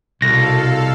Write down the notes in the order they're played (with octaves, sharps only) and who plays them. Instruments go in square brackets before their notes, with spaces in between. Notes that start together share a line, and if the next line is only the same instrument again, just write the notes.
[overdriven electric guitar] C2 [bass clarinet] B2 [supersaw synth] A4 F5 [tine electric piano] A#6